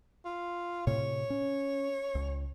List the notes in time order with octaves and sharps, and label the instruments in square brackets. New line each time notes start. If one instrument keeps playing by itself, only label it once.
[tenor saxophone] F4
[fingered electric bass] A2 C3 [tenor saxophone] C#5
[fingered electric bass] C#4
C#2